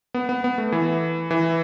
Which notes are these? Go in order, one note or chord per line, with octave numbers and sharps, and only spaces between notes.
B3
B3
B3
A3
E3
E3